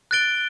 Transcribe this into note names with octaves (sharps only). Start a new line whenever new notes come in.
F#6 A6 D7 G7